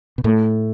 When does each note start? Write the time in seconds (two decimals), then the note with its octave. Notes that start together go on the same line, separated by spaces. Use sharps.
0.18 B2
0.24 A2 A3